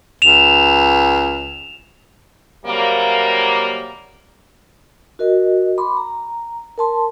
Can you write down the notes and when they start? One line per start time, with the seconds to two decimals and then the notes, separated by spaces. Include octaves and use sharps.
0.22 C#2 E7 F7
2.66 C3 F#3 G3 A#3
5.19 F#4 A#4 D#5
5.78 B5 C6 D6
5.97 A#5
6.78 A#4 A5 C6